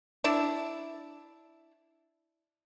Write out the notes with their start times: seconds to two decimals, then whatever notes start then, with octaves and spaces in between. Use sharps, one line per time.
0.24 D4 E4